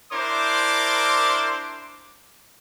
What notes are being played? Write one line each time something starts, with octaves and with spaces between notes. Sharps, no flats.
D4 E4 A#4 C5 C6 D6